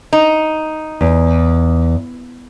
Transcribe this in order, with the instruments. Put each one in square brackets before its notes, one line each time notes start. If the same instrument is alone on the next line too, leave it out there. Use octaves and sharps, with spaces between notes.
[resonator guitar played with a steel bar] D#4
[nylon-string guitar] E2